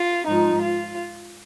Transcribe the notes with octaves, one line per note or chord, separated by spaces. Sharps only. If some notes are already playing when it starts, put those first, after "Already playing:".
Already playing: F4
G#2 F3 D#4
F4